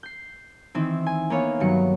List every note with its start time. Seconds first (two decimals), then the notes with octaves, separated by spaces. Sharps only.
0.03 G6 C7
0.74 D#3 E3 C4 E4
1.06 G#5
1.30 A#3 B3 C#5 F5
1.60 G2 D#3 F#3 C#7